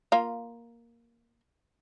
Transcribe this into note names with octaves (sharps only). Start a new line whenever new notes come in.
A#3 F4